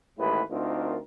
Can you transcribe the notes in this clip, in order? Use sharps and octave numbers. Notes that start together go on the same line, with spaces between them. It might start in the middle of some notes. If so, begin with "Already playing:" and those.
A1 D#2 A2 G#3 E4 B4
D2 C4 D#4 F4 A#4